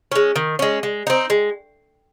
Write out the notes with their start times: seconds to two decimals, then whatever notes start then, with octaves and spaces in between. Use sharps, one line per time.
0.12 G#3 C#4
0.36 D#3
0.59 G#3 C#4
0.83 G#3
1.07 C4 D#4
1.30 G#3